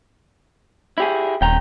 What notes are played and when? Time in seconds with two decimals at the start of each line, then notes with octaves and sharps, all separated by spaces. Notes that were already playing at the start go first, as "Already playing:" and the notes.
0.98 E4 G4 G#4
1.41 D#1 F2 G5 A#5